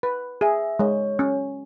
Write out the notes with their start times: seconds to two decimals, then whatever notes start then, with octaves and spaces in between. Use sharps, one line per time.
0.03 B4
0.41 G#4 E5
0.79 G#3 C#5
1.19 C#4